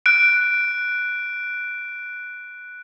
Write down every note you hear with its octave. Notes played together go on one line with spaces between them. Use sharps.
F#6 D7